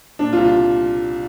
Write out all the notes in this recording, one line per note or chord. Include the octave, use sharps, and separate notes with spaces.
A#2 D4
F4
C2
F4